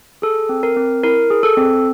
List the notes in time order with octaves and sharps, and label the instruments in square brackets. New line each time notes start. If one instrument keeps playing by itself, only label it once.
[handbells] G#4 A4
C4
A#4
C4
E4 A#4
G#4
A4
C4